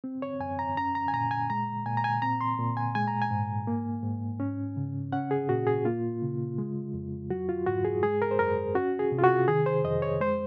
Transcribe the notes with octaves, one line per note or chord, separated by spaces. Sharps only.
C4
C#5
F#2 G#5
A#5
C#4 A#5
A#5
G#5
A#2 A#5
G#5
G#3 A#5
A#2 G#5
A#5
G#5
C4 A#5
C6
A#2
G#5
G#3 G#5
A#5
G#5
G#2
A#3
G#2
C#4
C#3
C#4 F#5
G#4
A#2 F#4
G#4
A#3 F4
C#3
G#3
F2
F#3 F#4
F4
G#2 F#4
G#4
G#3 G#4
A#4
C5
F#2 A#4
C#4 F#4
G#4
C3
F4
F#4
D#3 G#4
C5
F2 D#5
C#5
G#3 C5